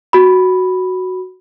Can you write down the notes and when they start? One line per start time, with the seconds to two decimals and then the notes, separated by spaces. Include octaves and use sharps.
0.13 F#4 B5